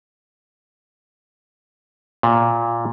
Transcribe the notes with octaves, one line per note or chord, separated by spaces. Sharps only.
A#2